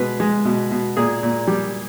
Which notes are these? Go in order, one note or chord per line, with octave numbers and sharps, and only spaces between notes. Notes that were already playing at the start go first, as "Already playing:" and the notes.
Already playing: B2 G#3 B4
G#3
B2
B2
A#2 G#4
A#2
G3